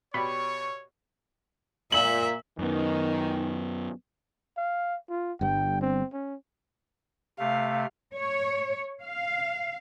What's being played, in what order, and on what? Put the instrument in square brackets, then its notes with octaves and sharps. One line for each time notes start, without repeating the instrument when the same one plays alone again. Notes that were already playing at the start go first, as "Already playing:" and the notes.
[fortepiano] B2 G4 D5 [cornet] C#5 [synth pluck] B5 [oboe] C#6
[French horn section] A#2 [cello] E5 [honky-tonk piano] F#7
[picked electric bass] F#2 B3 [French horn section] D#3
[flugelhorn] F5
F4
[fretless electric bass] G1 G2 [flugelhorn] G5
[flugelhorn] C4
C#4
[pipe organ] C3 A3 [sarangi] F5
[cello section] C#5
F5